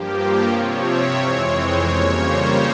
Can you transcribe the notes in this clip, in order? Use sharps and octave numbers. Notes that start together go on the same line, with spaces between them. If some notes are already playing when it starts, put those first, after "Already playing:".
Already playing: G2 F3 A#3 G4
G4
C3 F3 C4 C#5
E5
F2 E3 G#3 C4 C#5
C5
F2 C#3 G3 A#3 C#5
C5